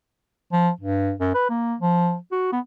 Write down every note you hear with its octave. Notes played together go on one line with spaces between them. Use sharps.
F3
G2
F#2
B4
A#3
F3
F#4
B3